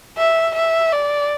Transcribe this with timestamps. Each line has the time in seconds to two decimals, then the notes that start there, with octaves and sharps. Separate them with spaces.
0.17 E5
0.55 E5
0.92 D5